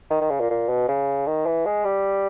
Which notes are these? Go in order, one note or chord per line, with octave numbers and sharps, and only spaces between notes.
D#3
D#3
C#3
A#2
A#2
B2
C#3
D#3
E3
G#3
G3